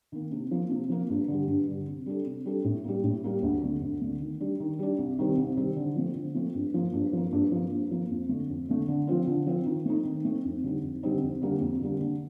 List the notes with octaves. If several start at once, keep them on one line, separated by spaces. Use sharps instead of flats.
D#3 A#3
C3
F3 A#3
C3
F3 A#3
G2
D3 G3
G2
D3 G3
C3
G3 D4 A4
C3
G3 D4 A4
A2
G3 A#3
A2
G3 A#3
D2
D3 A3
D2
D3 A3
D#3
G3 D4
D#3
G3 D4
C2
C3 D#3 G3 C4
C2
C3 D#3 G3 C4
D3
F3 A3 C4
D3
F3 A3 C4
G2
F3 A#3
G2
F3 A#3
G2
F3 A#3
G2
F3 A#3
F2
D3 A3
F2
D3 A3
D3
F3 C4 F4
D3
F3 C4 F4
D#3
A3 C4 D#4
D#3
A3 C4 D#4
F2
D3 G3 C4 D#4
F2
D3 G3 C4 D#4
F2
D3 G3 A#3
F2
D3 G3 A#3
D3